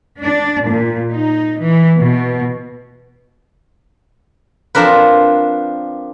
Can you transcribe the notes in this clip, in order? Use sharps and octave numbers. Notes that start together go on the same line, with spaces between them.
D4
A#2
D#4
E3
B2
F3 C4 D4 A#4 B4